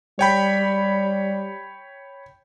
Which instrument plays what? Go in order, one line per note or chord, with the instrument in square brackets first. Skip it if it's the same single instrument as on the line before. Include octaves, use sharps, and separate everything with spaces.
[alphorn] G3 [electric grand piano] C#5 G5 B5